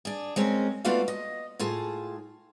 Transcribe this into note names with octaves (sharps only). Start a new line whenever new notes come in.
D4 G#4
G#3 C4 C#4 A#4
A3 B3 F4 F#4 D5 F5
D#5
A2 F4 G#4 A5